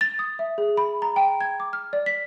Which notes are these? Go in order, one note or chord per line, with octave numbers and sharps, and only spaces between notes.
A6
D#6
E5
G#4
B5
A#5
G5
G#6
D6
F6
D5
B6